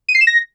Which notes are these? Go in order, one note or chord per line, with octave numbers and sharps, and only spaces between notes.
D#7
C7
E7
A#6